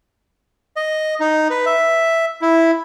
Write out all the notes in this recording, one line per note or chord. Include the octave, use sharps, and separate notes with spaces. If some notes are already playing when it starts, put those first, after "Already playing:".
D#5
D#4
B4
E5
E4